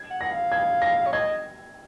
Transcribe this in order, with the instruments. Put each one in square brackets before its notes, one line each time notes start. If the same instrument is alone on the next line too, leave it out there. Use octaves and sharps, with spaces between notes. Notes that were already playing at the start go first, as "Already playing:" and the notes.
Already playing: [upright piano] G#6
[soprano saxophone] F#5
[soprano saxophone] F#5 [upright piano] A#6
[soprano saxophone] F5
[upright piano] G#6
A#6
[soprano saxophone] C#5
[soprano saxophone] D#5 [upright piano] G#6